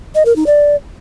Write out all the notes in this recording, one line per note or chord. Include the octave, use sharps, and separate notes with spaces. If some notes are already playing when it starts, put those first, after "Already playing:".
D#5
A#4
D#4
D5